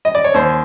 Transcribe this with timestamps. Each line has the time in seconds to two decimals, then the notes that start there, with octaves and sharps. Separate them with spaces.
0.05 D#5
0.15 D5
0.24 C#5
0.34 D#2 C5